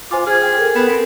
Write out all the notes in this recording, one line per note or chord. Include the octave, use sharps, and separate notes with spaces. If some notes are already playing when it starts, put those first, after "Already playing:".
F4 C5 G#5 D6
G#4 F6 G#6
G5
A4 A#4
B3 E7
C4